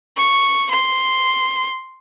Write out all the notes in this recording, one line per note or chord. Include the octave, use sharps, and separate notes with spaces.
C#6
C6